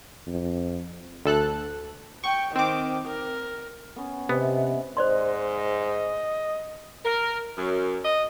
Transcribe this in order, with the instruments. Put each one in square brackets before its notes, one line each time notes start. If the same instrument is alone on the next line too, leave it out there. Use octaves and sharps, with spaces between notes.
[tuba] F2
[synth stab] D2 A4 F#6
[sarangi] G5 [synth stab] C#6
[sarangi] D#3 [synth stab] C4 D6
[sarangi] A#4
[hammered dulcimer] B3 C#4
[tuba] C3 [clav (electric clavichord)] B3 [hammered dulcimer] D#5 E5
[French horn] G#2 [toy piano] C5 D5 C6 [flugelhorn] D#5
[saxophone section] A#4
F#2
D#5